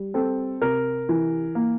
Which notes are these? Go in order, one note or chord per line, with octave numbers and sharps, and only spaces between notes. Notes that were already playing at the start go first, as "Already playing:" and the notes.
Already playing: G3
C4 A4
C3 A#4
E3
A#3